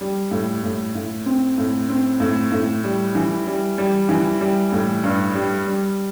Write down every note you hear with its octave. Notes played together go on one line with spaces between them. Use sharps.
G3
A2
A2
A2
C4
A2
C4
A2
A2
G3
E3
G3
G3
E3
G3
A2
G2
G3
G3